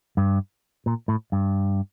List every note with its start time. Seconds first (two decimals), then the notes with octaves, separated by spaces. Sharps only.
0.17 G2
0.86 A#2
1.08 A2
1.32 G2